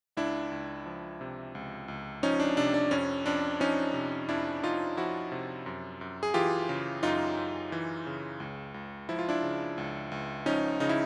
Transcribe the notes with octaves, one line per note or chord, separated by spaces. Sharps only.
C#2 D4 E4
C#2
F3
C3
C#2
C#2
F3 C#4 D#4
D4
C3 D4
D4
F2 C#4
F2 D4
F3 C#4 D#4
C3
F2 D4 E4
F2 D#4 F4
F3 E4 F#4
C3
F#2
F#2
G#4
E3 F4 G4
C#3
F#2 D#4 F4
F#2
E3
C#3
C#2
C#2
F3 E4
F4
D4 E4
C#3
C#2
C#2
F3 C#4 D#4
C#3 D#4
E4